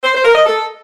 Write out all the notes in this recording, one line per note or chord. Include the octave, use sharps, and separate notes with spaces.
C5
C5
A#4
D#5
A4